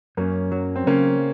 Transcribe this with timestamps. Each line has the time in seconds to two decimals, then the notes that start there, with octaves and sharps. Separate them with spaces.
0.17 F#2 A#3 C#4
0.52 F#3
0.76 C4
0.87 C#3 A#3 C#4